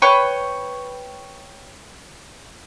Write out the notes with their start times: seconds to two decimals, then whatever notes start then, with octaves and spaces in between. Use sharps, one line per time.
0.02 B4 C#5 G5 C#6